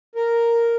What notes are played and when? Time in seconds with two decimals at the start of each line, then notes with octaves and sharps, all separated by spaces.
0.15 A#4